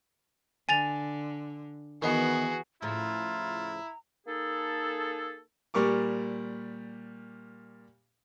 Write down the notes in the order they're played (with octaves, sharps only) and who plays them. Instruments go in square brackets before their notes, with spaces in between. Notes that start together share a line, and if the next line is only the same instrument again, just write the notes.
[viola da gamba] D3 [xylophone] G#5 A6 F7
[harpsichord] D#3 B3 [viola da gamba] E3 [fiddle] F#4 G#4
[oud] A2 C#3 F3 [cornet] E4 [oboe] F4 [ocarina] A#5
[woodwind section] A#3 D#4 G#4 A4
[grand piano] A#2 G3 A#4 C#6 D6